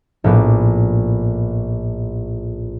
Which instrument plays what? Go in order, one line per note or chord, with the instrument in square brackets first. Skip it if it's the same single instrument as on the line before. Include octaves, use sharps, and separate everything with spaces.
[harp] A#1 A2 B3 D6